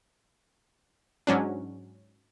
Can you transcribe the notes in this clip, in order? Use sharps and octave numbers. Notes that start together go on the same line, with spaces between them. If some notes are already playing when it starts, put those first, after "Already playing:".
G#2 F#3 C#4 D4